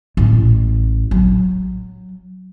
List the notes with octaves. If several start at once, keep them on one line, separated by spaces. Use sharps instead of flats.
A1
F#3